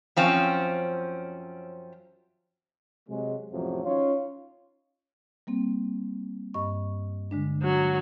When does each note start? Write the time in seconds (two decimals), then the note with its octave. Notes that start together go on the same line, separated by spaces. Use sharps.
0.16 F#2 F3 C4 C#4
3.08 C3 F#3 G#3
3.51 A1 F2 C3 F3 F#3
3.84 C#4 D#4 F4 C#5
5.47 G3 A#3 C4
6.54 G2 D#5 C#6
7.31 D3 G#3 D4
7.63 F#3